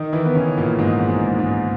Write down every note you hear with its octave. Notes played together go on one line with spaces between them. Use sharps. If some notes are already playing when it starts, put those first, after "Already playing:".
Already playing: D#3 D#4
E3 E4
B3
C#3 C#4
A#2 A#3
G#2 G#3
G#2 G#3
G#2 G#3